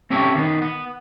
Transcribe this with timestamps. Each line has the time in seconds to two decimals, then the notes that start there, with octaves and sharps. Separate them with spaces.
0.10 C4 C#4 E4 G4 A4 C#5
0.35 D#3 B3
0.62 B3